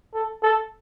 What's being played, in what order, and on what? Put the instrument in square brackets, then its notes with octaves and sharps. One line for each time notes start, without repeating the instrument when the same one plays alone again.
[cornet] A4
A4